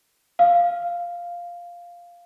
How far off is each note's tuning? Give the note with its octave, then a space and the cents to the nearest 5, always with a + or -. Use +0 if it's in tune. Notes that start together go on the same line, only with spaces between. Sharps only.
F5 +0